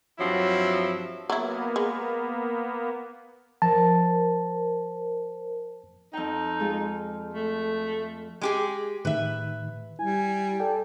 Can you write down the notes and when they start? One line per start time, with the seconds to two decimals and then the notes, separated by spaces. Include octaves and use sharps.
0.20 G2 F3 F#3 C4 E4
1.30 F#3 A#3 B3 E4
1.76 G#3
3.62 F3 A#4 C5 A5
6.13 F2 D#4 G5
6.60 G#3 F4
7.34 A3
8.41 G#3 G4 G#4
9.05 A2 D#3 B4 E5
9.99 G3 E4 G#5
10.60 A4 D5 G5